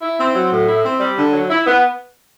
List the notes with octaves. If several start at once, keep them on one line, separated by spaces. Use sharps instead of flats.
E4
C4
F#3
A2
E4
C4
G3
D3
F#3
E4
B3